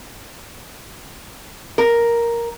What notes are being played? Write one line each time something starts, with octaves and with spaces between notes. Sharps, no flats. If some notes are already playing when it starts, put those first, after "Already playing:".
A#4